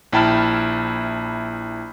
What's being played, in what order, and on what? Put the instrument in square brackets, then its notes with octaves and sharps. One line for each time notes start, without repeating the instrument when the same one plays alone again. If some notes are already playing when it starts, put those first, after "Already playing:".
[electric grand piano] A#1 E4 G5 A5 B5 F6